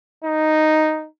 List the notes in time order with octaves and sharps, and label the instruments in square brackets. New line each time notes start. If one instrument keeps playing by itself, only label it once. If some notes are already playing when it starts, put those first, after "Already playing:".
[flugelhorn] D#4